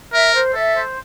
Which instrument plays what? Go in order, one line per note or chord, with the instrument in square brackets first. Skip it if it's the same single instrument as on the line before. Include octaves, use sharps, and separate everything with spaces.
[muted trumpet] A#4 [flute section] E5
[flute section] C5
[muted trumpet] A4 [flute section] E5
[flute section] C5